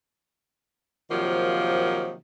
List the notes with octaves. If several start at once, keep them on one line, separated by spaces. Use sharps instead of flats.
C3 D#3 F3 F#3 A#3